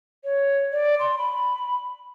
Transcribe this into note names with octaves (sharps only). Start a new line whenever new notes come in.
C#5
D5
C6
B5